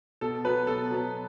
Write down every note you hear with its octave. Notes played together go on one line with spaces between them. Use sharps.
B2 A4
F#3 B3 B4
B2 A4
F#3 B3